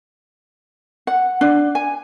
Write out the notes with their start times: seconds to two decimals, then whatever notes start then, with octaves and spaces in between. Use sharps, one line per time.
1.07 F#5
1.41 D4
1.75 G#5